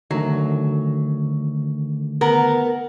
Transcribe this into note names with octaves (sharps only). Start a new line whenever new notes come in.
D3 D#3 F#3 A3
B3 A#4